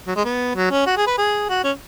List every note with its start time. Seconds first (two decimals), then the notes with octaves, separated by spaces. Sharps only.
0.07 F#3
0.16 G#3
0.25 B3
0.55 F#3
0.71 C#4
0.86 F#4
0.97 G#4
1.07 B4
1.18 G#4
1.49 F#4
1.64 C#4